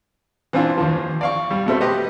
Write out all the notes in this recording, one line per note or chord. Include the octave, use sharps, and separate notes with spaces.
E3 C4 D4 F4
D#2 F3
D5 F5 C#6
G3
B2 A3 C4
G4 B4 D#5